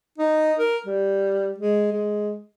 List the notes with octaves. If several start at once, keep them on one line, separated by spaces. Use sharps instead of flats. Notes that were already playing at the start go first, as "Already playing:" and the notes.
D#4
A#4
G3
G#3
G#3